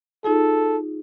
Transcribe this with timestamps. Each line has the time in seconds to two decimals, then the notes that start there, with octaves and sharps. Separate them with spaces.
0.24 D#4 F4 G#4 A4